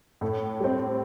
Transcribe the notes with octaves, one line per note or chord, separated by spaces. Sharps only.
A2 A4
G3 C4